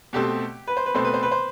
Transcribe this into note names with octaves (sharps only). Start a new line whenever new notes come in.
B2 A3 C4 G4
B4
C5
B4
B2 A3 C4 C5
B4
C5
B4
C5